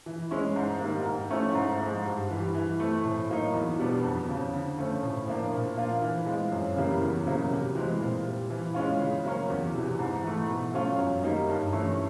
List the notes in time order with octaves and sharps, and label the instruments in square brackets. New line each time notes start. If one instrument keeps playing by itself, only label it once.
[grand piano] E3
G#3 C#4 E4
G#2
D#3 G3 A#3
G#2
F3 A3 C#4 E4
G#2
F3 G#3
G2
E3 G3
E3
A3 C4
A2
F#3 A#3 D#4
E2
B2 G3 B3 D4
F2
C#3 F3
D3
F3 A3 C#4
A2
F3 A#3 D4
A#2
F3 A#3 D4 F4
E3
G#3 C4 F4
F#2
C#3 E3 G3 A#3
E2
C#3 F#3 A#3
C3
E3 G#3 C4
A#2
G3 C4
E3
G#3 C#4 F4
C#3
F#3 A#3 C#4
E2
C3 E3
G#2
E3 A3
B2
F#3 A3 C#4 F4
F#2
D#3 G3 A#3 D#4
G2
E3 A3 C#4 E4